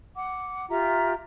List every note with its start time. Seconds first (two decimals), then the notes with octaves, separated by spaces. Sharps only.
0.15 F#5 D6
0.69 F4 G4 E5 A#5